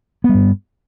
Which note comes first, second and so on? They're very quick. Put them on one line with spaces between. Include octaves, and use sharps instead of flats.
B3 G3 G2